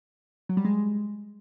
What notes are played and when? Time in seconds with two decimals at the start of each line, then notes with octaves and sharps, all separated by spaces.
0.49 F#3
0.57 G3
0.65 G#3